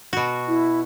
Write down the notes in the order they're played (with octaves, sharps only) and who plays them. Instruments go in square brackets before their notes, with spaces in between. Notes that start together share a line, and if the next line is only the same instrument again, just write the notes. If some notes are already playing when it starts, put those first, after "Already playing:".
[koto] B2 F#4
[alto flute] E4